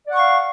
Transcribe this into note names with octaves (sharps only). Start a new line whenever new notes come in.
D5 F5 F#5 C#6